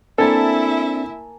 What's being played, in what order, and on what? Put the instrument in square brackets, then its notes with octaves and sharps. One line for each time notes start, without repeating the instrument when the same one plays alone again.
[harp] A#3 G#5 A5 [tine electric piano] C4 D4 [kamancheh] E4 E5 [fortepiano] A4